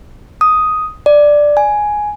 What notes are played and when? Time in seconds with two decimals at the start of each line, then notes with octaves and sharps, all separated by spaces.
0.41 D#6
1.06 D5
1.57 G#5